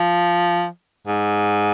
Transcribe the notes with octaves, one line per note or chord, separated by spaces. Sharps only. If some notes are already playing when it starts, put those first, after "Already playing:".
Already playing: F3
G#2